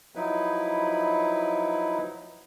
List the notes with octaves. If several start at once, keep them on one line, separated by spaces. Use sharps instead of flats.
F3 F#3 D#4 E4 B4